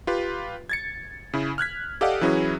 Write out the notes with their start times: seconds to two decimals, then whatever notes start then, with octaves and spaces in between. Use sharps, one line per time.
0.07 F4 G4 B4
0.69 G#6 A6 C#7
1.33 C#3 E4
1.58 F6 F#6 G#6 B6
2.01 G4 A4 D5 D#5 F5 F#5
2.21 E3 F#3 C#4 E4 F#4 G#4